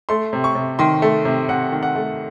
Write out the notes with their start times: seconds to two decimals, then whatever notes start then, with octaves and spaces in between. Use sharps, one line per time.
0.09 A3 C6
0.33 C3
0.44 C#6
0.55 C3
0.79 D#3 C6
1.02 A3
1.25 C3
1.49 C3 F#5
1.72 D#3
1.83 F#5
1.95 A3